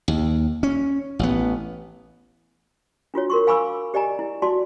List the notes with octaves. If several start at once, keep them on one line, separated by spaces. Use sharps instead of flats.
D#2
C#4
A1 B3
D4 F4 F#4 C#5
A#4 C6 C#6
F5 G#5 B5 C#6 D6 E6
G4 D5 D#5 G#5 A#5
E4
F#4 D5 A5 C6